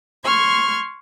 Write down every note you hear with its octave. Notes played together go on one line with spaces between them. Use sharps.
C6 C#6 F6 G#6